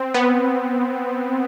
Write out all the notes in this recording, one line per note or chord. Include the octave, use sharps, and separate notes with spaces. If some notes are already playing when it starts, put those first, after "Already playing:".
Already playing: C4
B3